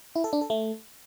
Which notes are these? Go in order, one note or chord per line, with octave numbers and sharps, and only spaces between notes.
E4
A4
D4
A4
A3